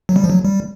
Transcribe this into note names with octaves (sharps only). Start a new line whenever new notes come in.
F#3
G3
F3
F#3
G3